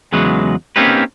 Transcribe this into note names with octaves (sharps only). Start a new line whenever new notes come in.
E2 C#3 F#3 G#3 B4
A#3 C4 C#4 D#4 G4 B4